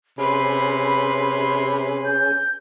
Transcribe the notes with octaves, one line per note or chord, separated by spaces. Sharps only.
C3 C#4 G#4 B4 B5 C6
G6